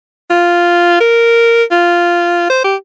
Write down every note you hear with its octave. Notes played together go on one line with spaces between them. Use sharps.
F4
A#4
F4
C5
G4